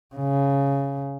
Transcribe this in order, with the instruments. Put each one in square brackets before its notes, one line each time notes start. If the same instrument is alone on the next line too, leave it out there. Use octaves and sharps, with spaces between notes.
[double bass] C#3